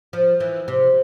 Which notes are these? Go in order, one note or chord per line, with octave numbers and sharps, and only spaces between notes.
F3
E3
C3